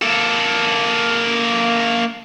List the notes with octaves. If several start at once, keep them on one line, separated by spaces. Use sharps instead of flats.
A#3 A4